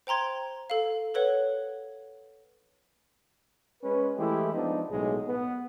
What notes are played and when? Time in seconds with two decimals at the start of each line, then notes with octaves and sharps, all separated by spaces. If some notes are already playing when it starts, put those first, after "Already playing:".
0.07 C5 G5 A#5 C6 G#6
0.70 A4 F5
1.14 A4 B4 C#5 F#5
3.83 G#3 C#4 B4
4.18 E3 G#3 A3 E4 G4
4.53 F3 G#3 B3 D4 D#4
4.91 B1 A2 G#3
5.28 B3